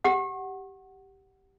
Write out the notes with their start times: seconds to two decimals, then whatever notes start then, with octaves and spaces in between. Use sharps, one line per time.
0.04 G4 F#5